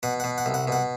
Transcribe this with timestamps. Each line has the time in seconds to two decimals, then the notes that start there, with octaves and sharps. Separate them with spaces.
0.03 B2 F#5
0.20 F#5
0.24 B2
0.38 F#5
0.46 C2
0.54 F#5
0.68 B2 F#5